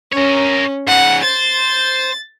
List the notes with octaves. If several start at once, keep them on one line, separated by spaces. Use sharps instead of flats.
C#4 A#4 C#5
G#2 C#3 F#5
C5 A6